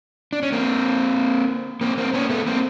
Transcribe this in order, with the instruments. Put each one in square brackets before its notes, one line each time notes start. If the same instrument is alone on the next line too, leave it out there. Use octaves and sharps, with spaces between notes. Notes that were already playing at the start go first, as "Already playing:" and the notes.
[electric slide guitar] D4
C#4
A#3 C4
A#3 C4
A#3 C4
B3 C#4
A3 B3
A#3 C4